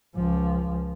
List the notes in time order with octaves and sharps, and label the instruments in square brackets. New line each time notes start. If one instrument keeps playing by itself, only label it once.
[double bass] C#2 F3